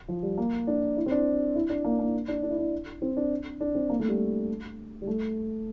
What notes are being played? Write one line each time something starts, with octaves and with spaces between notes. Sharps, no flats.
F3
G3
A#3
D4
E4
C4
D4
E4
D4
A#3
A#3
D4
D4
E4
D4
C4
D4
D4
C4
A#3
A3
G3
G3
A3